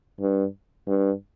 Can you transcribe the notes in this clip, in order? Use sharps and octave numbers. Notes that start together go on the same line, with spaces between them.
G2
G2